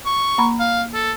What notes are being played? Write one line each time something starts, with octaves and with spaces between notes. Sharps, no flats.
C#6
A#3 A#5 B5
F5
A4